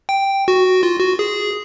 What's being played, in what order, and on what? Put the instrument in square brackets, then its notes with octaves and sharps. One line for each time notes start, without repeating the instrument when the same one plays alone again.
[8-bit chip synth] G5
F#4
F4
F#4
G#4